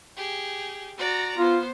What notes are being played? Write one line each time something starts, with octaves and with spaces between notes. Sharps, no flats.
G4 G#4
F#4 D5 A#5
B3 F4 C5